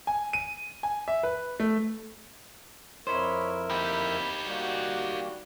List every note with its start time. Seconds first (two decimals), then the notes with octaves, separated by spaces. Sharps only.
0.07 G#5
0.33 D#7
0.83 G#5
1.08 E5
1.23 B4
1.60 A3
3.07 F2 E4 A#4 C5 C#5 D#5 B5
3.70 D#4 G4 B5
4.46 G3 A#3 F#4